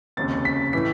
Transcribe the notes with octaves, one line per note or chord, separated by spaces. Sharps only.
F1 D#2 C#3 A6
B6
A2 E3 B6